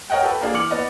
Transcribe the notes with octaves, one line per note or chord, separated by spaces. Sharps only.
A#4 C#5 D#5 F#5 G5
G4 A4 B4
A#3 D4 G#4
E3 D6 F6 C#7 F#7
B3 D5 D#5